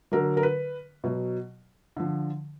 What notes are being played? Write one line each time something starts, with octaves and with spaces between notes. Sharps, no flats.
D3 F#3 A#4
A#4
B4
B2 F#3
D3 F3